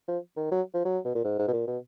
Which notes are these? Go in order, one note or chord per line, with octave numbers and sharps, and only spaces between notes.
F3
D#3
F#3
F3
F#3
B2
A#2
G#2
G#2
B2
A#2
B2